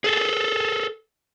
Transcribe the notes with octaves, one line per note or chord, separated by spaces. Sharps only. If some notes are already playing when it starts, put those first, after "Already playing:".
G#4 A4